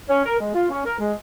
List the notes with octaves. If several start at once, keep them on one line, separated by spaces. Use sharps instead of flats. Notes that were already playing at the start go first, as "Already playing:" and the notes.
C#4
A#4
G#3
F4
C#4
A#4
G#3